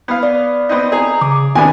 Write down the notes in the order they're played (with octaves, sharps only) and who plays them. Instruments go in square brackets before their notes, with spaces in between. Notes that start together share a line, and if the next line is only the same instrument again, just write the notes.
[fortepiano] B3 F5
[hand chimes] D5
[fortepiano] B3 C4 D#4
[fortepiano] G#4 [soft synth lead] A#5
[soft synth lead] C#3 [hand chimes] D6
[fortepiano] C3 B3 D4 [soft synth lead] D#3 [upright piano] G#5